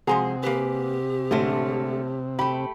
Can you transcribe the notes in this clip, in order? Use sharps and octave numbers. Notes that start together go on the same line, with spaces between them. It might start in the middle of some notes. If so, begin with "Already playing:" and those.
C3 F3 G#3 F#4 G#4 A#5
A#3 G4 B4
A1 D3 G#3 A3
A3 G4 B5